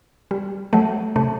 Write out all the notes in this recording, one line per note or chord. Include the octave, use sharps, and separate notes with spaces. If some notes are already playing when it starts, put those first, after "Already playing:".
G3
F#3 A3
C3 A3